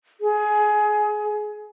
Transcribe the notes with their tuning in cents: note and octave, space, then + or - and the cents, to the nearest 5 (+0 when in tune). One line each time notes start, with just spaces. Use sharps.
G#4 +20